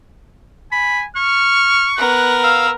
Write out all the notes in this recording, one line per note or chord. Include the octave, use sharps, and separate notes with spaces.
G#5 B5
C#6 F6
B3 A#4 F#6
F5 E6